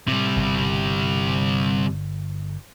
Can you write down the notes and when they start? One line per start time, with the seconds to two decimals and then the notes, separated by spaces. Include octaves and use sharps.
0.08 A2 C3 G3
0.36 G1 B2 D3